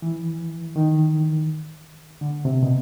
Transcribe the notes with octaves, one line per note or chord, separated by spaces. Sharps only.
E3
D#3
D3
C3
B2